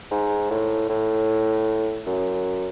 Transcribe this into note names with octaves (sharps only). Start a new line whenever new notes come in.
G#2
A2
A2
F#2